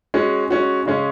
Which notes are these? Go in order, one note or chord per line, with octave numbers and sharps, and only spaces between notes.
G#3 C#4 F#4
G#3 C#4 F#4
C#3 G#3 C#4